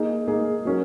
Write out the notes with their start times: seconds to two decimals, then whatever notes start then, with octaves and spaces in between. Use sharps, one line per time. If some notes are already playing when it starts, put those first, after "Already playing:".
Already playing: A#3 D#4 G#4
0.28 A#3 D#4 G#4
0.65 F#3 C#4 A#4